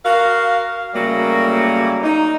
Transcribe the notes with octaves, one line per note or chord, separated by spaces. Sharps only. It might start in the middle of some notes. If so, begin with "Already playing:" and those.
F#4 A#4 F5
C#3 F#3 G3 A3 A#3
D#4